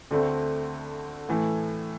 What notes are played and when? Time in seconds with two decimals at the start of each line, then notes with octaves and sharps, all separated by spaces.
0.11 D2 D3 A3 C4
1.29 A2 E3 A3